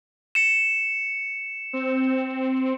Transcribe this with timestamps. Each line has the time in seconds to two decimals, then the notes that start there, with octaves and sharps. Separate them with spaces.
0.35 C#7 E7
1.73 C4